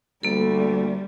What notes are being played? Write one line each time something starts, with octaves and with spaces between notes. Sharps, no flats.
D2 G3 A#3 A4